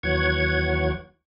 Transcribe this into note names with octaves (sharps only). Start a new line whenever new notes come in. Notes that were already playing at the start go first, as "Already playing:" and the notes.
D#2 E3 F#3 C#5 F#5 G#6